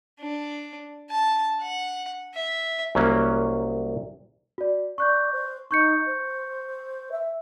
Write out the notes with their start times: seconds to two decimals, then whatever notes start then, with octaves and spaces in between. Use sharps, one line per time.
0.20 D4
1.11 A5
1.62 F#5
2.34 E5
2.95 C2 F#3 A#3 C#4
4.58 F#4 D5
4.98 D5 C#6 F#6 G6
5.32 C5
5.71 D#4 C#6 G6 C#7
6.06 C5
7.12 E5